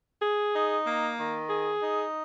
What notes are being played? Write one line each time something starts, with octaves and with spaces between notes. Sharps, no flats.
G#4
D#4
A#3
D#3
G#4
D#4